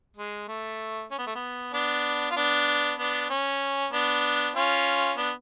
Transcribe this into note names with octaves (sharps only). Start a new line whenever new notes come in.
G#3
A3
C#4
B3
A3
B3
B3 D4
F4
B3 D4
B3 D4
C#4
B3 D4
C#4 F4
B3 D4